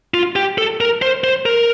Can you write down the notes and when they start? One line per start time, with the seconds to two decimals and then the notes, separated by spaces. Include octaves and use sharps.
0.14 F4
0.36 G4
0.58 A4
0.81 A#4
1.02 C5
1.24 C5
1.46 A#4